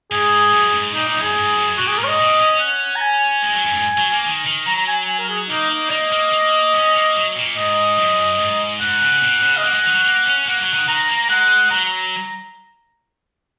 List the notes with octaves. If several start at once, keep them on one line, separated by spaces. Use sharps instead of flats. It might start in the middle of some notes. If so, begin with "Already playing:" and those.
G#2 G#4
F#2
G#2
A#2 D#4
D#4
F#2
G#4
G#2
F#2
A#2 F#4
G#4
G#2 A#4
C#5
D#5
A#2
C#4
F#5
A#5
G#5
G#3
F#3
F#2
G#2
F#3
A#3
D#3
D#3
F#3 A#5
A#5
G#5
G#5
A#4
G#4
A#3 D#4
D#4
A#3 D#5
A#3
A#3
C#4
A#3
F#3
A#2
G#2 D#5
F#2
G#2
G#2 F#5
C#3
A#2
C#3
D#5
A#3 F#5
G#3
D#3
F#3
A#3
C#4
A#3 F#5
F#3
D#3
D#3 A#5
A#3
G#3 F#5
F#3 A#5